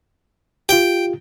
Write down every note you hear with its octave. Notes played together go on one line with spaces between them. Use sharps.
F4 G4 G5